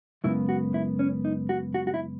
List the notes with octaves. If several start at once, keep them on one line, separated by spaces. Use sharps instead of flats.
F#2 C#3 G#3 B3 E4
F#4
E4
C#4
D#4
F#4
F#4
F#4
E4